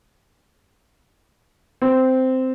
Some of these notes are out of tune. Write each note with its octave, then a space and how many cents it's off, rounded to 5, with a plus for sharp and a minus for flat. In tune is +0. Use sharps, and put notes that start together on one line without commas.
C4 -10